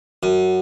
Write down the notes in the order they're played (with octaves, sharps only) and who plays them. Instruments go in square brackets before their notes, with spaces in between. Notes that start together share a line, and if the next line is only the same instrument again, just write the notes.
[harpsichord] F#2